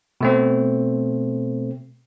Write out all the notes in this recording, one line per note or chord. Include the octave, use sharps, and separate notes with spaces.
B2 A3 C4